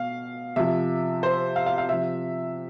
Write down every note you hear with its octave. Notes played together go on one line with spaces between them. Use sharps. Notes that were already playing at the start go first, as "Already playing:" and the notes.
Already playing: B2 F5
C3 F3 E5
C5
F5
F5
F5
C3 F3 E5